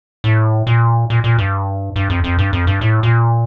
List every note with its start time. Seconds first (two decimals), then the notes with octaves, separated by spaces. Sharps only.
0.24 A2
0.67 A#2
1.10 A#2
1.24 A#2
1.38 G2
1.96 G2
2.10 F2
2.24 F2
2.38 G2
2.53 F2
2.67 G2
2.81 A2
3.03 A#2